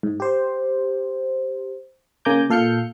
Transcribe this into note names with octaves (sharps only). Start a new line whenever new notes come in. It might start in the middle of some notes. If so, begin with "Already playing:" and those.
G#2
G4 C5
C#3 A#3 G#5 A#5 D6 G6
A#2 A4 F5 F6 G6 C#7